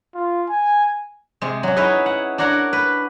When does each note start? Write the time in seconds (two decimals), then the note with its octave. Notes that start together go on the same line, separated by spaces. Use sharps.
0.15 F4
0.49 G#5
1.41 C3 G#3
1.63 F#3 C#4
1.76 D#4 E4 G#4 B4 C#5 D#5
2.06 F#5
2.38 D4 F#4 A#4 C#5 F#5
2.73 B4